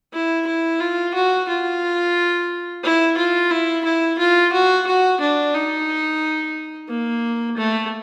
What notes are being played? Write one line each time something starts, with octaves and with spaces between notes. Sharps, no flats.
E4
E4
F4
F#4
F4
E4
F4
E4
E4
F4
F#4
F#4
D4
D#4
A#3
A3